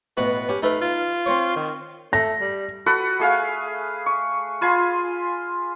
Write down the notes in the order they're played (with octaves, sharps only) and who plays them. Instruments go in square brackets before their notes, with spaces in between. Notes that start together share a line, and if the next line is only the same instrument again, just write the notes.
[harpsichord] A1 B2 F#4 [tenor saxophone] B4
[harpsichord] C#4 G4
[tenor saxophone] A3 [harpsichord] D#4 B4 F5
[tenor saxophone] F4
[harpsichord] C4 C5 C#5
[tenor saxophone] D#3
[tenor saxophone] A3 [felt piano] A#6
[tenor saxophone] G3
[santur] F#4 A4 B4 F#5
A3 G#4 F5
C#6
F4 G#5 B5 C6